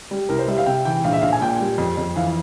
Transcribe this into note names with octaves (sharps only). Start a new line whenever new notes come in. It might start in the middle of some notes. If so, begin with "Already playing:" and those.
G3
C2 A#4
C5
G3 E5
F5
C3 G5
E3 G5
A#1 F5
E5
A#1 F5
G#5
A#2 G5
G3
F2
F2
E3 F5